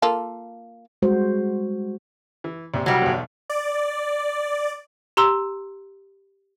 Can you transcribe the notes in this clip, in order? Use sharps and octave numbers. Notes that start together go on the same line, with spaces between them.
A#3 F4 A4
G3 G#3 F#4 C5
E3
A#1 C3 G4
C2 F#3 G3 F6
B1 E2
D5
G4 A#5 C6 E6